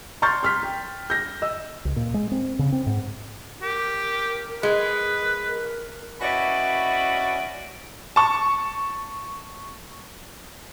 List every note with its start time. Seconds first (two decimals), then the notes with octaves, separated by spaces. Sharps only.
0.22 A#5 C6 C#6 F6 G6 A6
0.43 C6 F6 B6
0.63 G5
1.10 G6 A#6
1.42 D#5 E6
1.85 C#2
1.96 A#2
2.14 G#3
2.32 C4
2.59 C#3
2.72 C4
2.86 G#2
3.62 G4 A#4
4.63 G#3 B4
5.48 A#4
6.21 C#4 E4 F#4 B4 D5 D#5
8.16 A5 C#6